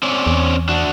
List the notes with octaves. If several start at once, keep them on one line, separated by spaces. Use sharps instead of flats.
C4 C#4 D5
E2
D4 F#4